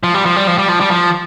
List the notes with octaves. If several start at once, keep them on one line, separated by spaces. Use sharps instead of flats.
F3
G3
F3
G3
F3
G3
F3
G3
F3